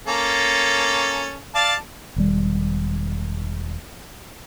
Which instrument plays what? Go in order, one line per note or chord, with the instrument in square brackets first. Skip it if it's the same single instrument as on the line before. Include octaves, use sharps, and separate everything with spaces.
[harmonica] A#3 C#4 A4
D5 F5 A5
[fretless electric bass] E1 D#3 G3